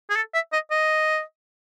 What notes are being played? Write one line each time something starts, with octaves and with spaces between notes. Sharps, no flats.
G#4
A4
E5
D#5
D#5